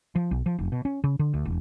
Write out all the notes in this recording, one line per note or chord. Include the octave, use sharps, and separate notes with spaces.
F3
B1
F3
F1
B2
C#4
C#3
D3
D2
E1